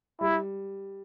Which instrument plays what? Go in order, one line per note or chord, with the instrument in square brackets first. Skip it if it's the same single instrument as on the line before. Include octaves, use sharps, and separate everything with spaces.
[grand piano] G3 [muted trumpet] E4